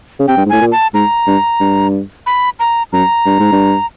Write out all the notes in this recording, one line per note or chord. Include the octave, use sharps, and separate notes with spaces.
C#3
C3 G5
G2
G#2
A2 G#5
A#2
A5
G#2 A#5
G2
G2
B5
A#5
F#2 A#5
G2
G#2
G2